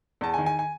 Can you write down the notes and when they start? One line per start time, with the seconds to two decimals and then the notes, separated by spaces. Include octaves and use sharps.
0.21 E2 A5
0.34 G#5
0.38 D#3
0.46 G#5
0.59 G#5